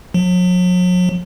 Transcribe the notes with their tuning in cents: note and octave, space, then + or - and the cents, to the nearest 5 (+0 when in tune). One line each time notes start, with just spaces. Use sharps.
F#3 -40